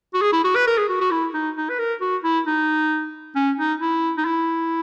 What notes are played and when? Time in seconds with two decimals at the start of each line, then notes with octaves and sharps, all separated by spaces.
0.14 F#4
0.21 G#4
0.32 E4
0.44 F#4
0.55 B4
0.67 A#4
0.77 G#4
0.89 F#4
1.00 F#4
1.11 E4
1.34 D#4
1.56 D#4
1.69 B4
1.79 A#4
2.01 F#4
2.23 E4
2.45 D#4
3.35 C#4
3.58 D#4
3.80 E4
4.17 D#4
4.25 E4